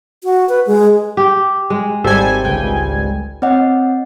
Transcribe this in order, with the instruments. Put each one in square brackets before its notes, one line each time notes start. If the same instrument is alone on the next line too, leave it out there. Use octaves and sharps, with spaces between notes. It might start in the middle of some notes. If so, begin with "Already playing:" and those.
[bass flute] F#4
B4
G#3
[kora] G4
G#3
[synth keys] G#1 G3 G#5 [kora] A4 C5 E5
[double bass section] C#2 [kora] G5
[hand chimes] C4 C#5 D#5 F#5